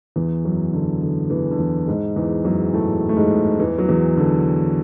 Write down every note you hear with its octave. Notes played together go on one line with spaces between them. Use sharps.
E2 E3
F#2 F#3
D3
D3
E2 E3
D3
E2 E3
G#2 G#3
E2 E3
F#2 F#3
A2 A3
A3
G#2 G#3
E2 E3
F#3
E2 E3
D3